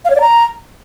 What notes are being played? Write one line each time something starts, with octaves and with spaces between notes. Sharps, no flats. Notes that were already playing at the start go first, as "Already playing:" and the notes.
F5
C#5
D5
A#5